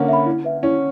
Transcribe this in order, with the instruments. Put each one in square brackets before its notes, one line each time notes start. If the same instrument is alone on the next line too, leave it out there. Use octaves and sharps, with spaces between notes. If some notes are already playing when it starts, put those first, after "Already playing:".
Already playing: [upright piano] D3 A#3 C#4
[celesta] E5 B5
E4
B4 E5
[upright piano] C#4 [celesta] E4